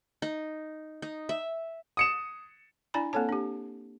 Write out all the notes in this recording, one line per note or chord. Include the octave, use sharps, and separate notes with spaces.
D#4
D#4
E5
D#6 C#7 E7
D4 E4 D5 G#5 A#5 B5
A#3 C4 A4 C#5 A5
D4 G4